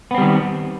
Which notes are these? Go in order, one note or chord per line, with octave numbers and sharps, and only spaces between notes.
D#3 G3 B3 C4